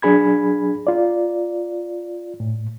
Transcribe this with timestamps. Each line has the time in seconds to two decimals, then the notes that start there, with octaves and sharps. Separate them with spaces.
0.02 F#3 D4 G#4 B5 G#6
0.87 F4 D5
2.40 A2